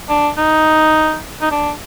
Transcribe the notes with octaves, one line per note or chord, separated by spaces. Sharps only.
D4
D#4
D#4
D4